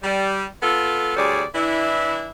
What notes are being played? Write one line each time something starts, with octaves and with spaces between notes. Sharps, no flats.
G3
B3 F4 A4
D2 G3 G#4 C#5 D5
E3 D4 E4